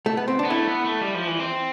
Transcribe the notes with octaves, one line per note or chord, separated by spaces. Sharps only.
A3
B3
C4
D4
B3
A3 E4
B3
A3
G3
F3
E3
C4